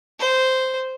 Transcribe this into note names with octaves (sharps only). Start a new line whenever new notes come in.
C5